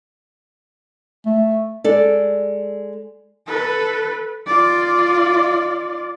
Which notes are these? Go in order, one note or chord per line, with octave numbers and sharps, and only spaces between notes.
A3
G#3 A4 D5
A4 B4
F4 D5